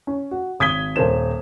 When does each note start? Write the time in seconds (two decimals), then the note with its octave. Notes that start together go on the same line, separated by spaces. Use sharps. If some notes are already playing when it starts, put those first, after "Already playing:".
0.07 C#4
0.31 F#4
0.60 G#1 D#6 G#6 B6 G7
0.96 D#1 A#4 C5 E7